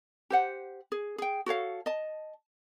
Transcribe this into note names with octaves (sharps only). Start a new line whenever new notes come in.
G4 C5 F#5
G#4
G#4 G5
F#4 A4 C#5 F5
D#5 A5